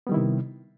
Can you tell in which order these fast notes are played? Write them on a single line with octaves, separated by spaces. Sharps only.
B3 G3 D#3 E4 C3